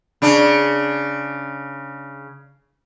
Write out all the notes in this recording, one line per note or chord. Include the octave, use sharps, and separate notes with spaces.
C#3 D4